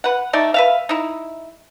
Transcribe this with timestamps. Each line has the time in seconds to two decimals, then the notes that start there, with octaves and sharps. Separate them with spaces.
0.04 B4 F#5
0.33 A3 D#4 D5
0.54 B4 E5 F5
0.89 D#4 E4